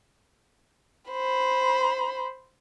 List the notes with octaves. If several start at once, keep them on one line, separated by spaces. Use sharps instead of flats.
C5 B5